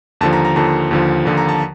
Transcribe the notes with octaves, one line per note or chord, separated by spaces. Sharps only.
D#2 D3 F3 A5
A#5
A#5
D#2 D3 F3 A5
D#2 D3 F3
D#2 D3 F3
A#5
A5